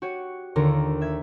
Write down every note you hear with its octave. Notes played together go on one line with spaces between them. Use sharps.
F#4 G4 C#5
D#2 D3 F4 A#4 C#5 A#5
E5 G#6